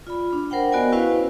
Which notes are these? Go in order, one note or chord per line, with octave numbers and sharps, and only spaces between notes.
F4 D5 B5
D4
A#4 C5 F#5 G5 B5
B3 F#4 A#4 D5 D#5 G#5
C#4 E4 F#4 B4 C5 F5